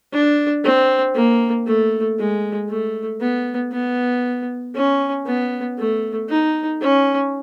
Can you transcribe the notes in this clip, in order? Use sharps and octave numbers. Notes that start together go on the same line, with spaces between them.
D4
C4
A#3
A3
G#3
A3
B3
B3
C#4
B3
A3
D#4
C#4